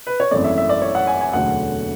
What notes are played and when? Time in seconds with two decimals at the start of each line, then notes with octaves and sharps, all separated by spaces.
0.07 B4
0.20 C#5
0.31 G#1 F#2 E3 A3 D5
0.44 E5
0.57 E5
0.69 D5
0.82 C#5
0.95 F#5
1.07 G#5
1.21 G#5
1.33 E1 D2 D3 F#3 A3 F#5